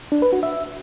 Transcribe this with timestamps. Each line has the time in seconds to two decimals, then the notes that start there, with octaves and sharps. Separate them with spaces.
0.12 D4
0.22 B4
0.33 F#4
0.43 E5